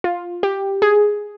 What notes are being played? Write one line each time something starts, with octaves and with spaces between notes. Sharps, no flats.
F4
G4
G#4